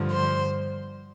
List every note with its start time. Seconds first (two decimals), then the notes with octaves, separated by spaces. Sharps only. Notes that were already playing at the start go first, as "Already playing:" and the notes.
Already playing: G2 D3 F3
0.13 C5